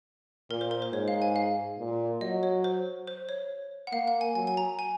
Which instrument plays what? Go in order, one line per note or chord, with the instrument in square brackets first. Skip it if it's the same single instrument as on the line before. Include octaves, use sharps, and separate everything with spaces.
[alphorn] A#2 [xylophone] A#4
[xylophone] C5
A#4
C5
[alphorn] G#2 [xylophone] C#5
[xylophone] F5
G#5
F5
[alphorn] A#2
[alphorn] F#3 [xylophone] D#5
[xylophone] C#5
C5
C5
C#5
F#5
[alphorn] A#3 [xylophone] F5
[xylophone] F#5
G#5
[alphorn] F#3 [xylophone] G#5
[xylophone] G#5
A#5
G#5